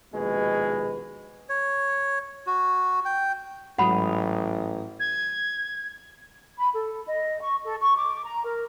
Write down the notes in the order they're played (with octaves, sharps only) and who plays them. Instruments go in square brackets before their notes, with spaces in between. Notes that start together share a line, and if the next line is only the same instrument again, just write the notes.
[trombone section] A#1 D#2 B2 G#3 B4
[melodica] C#5
F#4
G5
[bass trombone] A1 [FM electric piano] G#2 F#3 D#6 [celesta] F#5 B5
[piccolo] G#6
[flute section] B5
A4
D#5
C#6
A4
C#6
D6
A#5
A#4